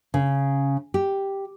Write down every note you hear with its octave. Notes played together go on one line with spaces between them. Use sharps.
C#3
G4